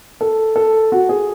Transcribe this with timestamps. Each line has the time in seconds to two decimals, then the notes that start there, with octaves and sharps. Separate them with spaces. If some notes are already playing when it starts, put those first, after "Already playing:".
0.21 A4
0.56 A4
0.92 F#4
1.09 G#4